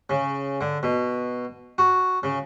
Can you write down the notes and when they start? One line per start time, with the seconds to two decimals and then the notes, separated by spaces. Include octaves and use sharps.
0.10 C#3
0.61 D3
0.83 B2
1.78 F#4
2.23 C#3